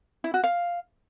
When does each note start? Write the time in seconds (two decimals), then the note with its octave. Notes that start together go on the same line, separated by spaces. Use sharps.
0.24 E4
0.34 F#4
0.44 F5